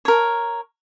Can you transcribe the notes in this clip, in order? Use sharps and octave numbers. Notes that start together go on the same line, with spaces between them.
A#4 C#5